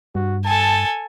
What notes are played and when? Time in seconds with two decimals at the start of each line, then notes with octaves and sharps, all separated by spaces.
0.15 G2 F#4
0.45 A4 G#5 A5